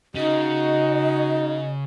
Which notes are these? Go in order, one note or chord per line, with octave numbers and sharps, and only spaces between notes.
C#3 D#4 F#4 D#5